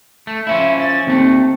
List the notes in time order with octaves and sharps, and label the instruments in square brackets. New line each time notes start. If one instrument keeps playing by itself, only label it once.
[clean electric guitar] A3
[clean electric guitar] F3 C#4 E4 [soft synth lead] E5
[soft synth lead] A6
[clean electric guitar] D#2 A3 [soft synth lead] C4